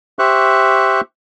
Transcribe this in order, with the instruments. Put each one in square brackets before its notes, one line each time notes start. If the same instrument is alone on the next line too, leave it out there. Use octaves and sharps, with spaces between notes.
[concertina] G4 C5 E5 C#6 F#6